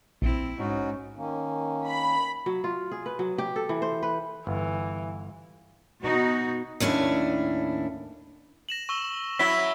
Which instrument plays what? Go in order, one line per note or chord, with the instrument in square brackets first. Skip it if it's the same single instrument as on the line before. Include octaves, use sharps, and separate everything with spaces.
[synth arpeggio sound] A#1 [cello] C4 E4
[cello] G#2 [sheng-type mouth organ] C#4 D#4 F#4
[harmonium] D#3 A#3 C#4
[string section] B5
[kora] F#3
F4
G#4
B4
F#3
G4
A4
E3
C5
B4
[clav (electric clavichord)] G1 [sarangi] E3
[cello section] B2 D#4 F#4
[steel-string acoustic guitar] D#2 A2 C#4 D4 E4
[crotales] A#6 E7 F#7
C#6 E6 G7
[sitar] F#3 E4 [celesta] B6 [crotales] G7